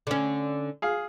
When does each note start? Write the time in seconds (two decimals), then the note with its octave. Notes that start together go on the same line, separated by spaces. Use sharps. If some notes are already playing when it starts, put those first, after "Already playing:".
0.07 D3 C#4
0.82 G#4 F5